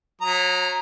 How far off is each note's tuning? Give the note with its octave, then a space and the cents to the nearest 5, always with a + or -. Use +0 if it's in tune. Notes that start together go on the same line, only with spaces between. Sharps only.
F#3 -30 A#5 +0 D#6 +15